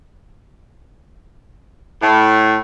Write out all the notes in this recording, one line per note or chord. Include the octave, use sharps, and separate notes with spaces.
A2